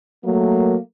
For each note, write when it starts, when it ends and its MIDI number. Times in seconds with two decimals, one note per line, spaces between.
0.25 0.76 54
0.25 0.76 57
0.25 0.76 58